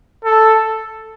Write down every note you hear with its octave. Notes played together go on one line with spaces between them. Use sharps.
A4